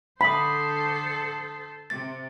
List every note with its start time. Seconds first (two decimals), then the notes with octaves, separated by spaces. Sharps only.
0.21 D3 A4 C5 B5 D#6 B6
1.90 C3 A6